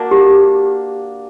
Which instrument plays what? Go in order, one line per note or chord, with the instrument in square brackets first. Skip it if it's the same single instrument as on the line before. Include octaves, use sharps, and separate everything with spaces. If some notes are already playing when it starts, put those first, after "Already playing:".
Already playing: [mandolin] A#3 D4 F#4
[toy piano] G4